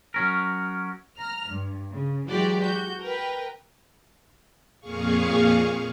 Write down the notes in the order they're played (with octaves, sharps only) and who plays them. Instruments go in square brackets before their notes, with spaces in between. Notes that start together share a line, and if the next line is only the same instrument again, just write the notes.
[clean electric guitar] F#3 C#4 A#4
[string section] A#5 F6
G2
C#3
E3 F#3 G#3 F#4 G4 D5
F#4 G6
A#4 B4 G5
[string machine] F2 A#2 G#4 F5 C#6